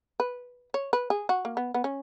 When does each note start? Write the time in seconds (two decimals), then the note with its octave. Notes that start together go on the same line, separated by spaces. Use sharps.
0.20 B4
0.74 C#5
0.93 B4
1.10 G#4
1.29 F#4
1.45 A#3
1.57 B3
1.74 B3
1.84 C#4